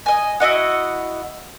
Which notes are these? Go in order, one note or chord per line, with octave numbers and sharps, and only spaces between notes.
D#5 G#5
E4 F#4 D#5 F#5